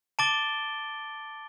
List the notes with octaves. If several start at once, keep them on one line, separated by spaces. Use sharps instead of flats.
A5 D6 A6 D7 G7